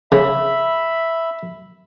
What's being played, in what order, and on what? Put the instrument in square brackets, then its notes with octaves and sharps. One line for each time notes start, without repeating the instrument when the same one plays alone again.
[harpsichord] C#3 [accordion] E5 B5